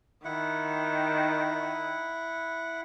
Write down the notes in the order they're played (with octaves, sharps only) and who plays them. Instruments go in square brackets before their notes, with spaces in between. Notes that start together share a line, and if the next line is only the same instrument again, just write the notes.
[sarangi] D#3 [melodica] E4 F#5